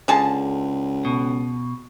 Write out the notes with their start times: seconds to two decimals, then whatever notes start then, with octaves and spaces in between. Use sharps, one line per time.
0.08 C#2 D3 G#4 A5
1.05 B2